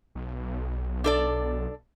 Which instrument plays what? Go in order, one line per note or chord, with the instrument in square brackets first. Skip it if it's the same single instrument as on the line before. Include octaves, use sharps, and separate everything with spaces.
[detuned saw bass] B1
[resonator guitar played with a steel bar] D4 A4 D5